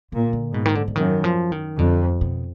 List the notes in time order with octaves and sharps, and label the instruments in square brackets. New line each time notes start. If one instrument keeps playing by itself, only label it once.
[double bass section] A#2 [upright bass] D3
[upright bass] D3
[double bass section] G#2 [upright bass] B2
[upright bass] D#3
D3
D3
[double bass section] F#2 [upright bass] D#3
[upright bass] F3
D#3
[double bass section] F2 [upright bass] D3
[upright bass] B2